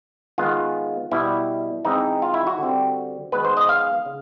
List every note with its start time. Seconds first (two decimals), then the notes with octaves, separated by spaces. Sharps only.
0.38 D#3 G#3 B3 F4
1.11 B2 G3 B3 E4
1.85 E3 G#3 C4 D#4
2.22 F4
2.34 E4
2.47 F#4
2.58 D3 G3 C4
3.32 D#3 G#3 B3 B4
3.45 C5
3.57 D#5
3.69 F5
4.06 C#3